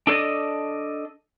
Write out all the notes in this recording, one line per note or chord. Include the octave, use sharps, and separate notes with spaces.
D4 A4 C5 D5 D#5